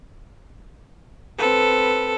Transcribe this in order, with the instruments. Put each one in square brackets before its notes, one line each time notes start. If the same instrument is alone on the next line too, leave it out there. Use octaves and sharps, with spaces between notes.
[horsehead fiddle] C4 B4 [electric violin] A4